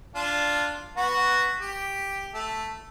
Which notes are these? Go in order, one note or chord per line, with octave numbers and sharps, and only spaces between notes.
D4 F4
B3 F#4
G4
A3